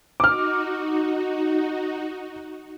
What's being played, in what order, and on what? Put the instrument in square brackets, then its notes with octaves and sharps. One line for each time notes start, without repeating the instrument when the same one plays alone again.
[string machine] D#4 F#4 [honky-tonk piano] D6 F6